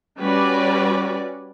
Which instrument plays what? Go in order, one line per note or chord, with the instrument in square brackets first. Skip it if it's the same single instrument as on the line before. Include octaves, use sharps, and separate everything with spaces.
[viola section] G3 C#4 F#4 B4 D5